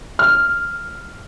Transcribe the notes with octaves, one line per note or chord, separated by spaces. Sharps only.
F6